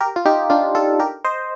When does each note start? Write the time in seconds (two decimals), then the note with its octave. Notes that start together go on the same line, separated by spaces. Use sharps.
0.01 G4 A#4
0.16 F4
0.25 D#4 G4
0.50 D4 F4
0.75 F4 A4
1.00 G4 A#4
1.25 C5 D#5